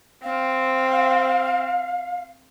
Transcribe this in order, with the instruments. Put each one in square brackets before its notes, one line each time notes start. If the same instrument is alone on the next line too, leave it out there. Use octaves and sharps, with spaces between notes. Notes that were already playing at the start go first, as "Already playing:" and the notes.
[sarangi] C4 [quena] F5